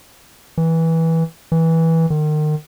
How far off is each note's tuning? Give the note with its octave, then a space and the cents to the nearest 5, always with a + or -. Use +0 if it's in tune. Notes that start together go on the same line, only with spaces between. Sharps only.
E3 -15
E3 -15
D#3 -35